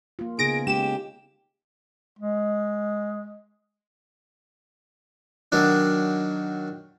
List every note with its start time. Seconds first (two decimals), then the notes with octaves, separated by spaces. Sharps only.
0.19 A#3 F4
0.39 C#3 B3 D#4 G#4 A#6 D7
0.67 G#3 C#4 D#4 G4 E7
2.19 G#3
5.52 D#3 F#3 D4